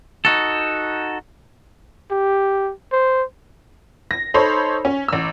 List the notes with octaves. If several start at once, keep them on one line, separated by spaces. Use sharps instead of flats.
D#4 F#4 A4
G4
C5
A#6
D#4 A4 C5 C#5 B5
C#4
A1 E6